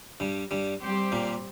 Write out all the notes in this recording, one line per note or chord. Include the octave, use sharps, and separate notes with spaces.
G2 G3
G2 G3
G3 C4 G4 C5
A#2 A#3